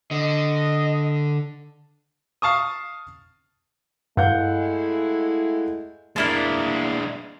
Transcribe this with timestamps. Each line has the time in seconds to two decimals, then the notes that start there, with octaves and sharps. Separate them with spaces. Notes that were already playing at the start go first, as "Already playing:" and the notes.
0.11 D3 D#5
2.42 F5 A5 C#6 D#6
4.17 G2 G#3 A3 E4 F5 F#5 G6
6.16 G#3 A#3 D4 E4 A5